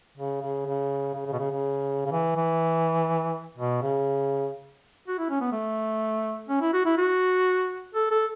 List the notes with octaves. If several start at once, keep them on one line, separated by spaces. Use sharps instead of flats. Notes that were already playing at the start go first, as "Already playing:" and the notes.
C#3
C#3
C#3
C#3
C#3
B2
C#3
C#3
C#3
E3
E3
B2
C#3
F#4
E4
C#4
B3
A3
C#4
E4
F#4
E4
F#4
A4
A4